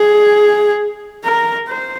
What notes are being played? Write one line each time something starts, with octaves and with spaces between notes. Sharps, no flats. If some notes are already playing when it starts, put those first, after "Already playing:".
Already playing: G#4
A#4
C5